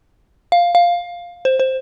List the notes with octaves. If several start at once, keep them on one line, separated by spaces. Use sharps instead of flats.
F5
F5
C5
C5